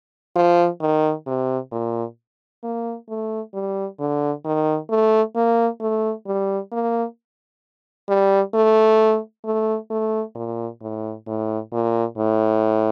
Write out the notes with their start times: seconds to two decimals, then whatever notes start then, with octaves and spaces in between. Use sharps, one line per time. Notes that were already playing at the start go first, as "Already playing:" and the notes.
0.36 F3
0.81 D#3
1.26 C3
1.72 A#2
2.63 A#3
3.09 A3
3.54 G3
4.00 D3
4.45 D#3
4.90 A3
5.36 A#3
5.81 A3
6.27 G3
6.72 A#3
8.09 G3
8.54 A3
9.45 A3
9.90 A3
10.35 A#2
10.82 A2
11.27 A2
11.73 A#2
12.18 A2